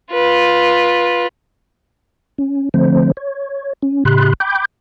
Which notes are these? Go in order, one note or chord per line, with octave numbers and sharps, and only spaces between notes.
F4 B4
C#4
D3 F3 A3 C4 C5
C#5
C#4
A2 C#3 G4 B5 C6 F#6
G5 B5 D6 G6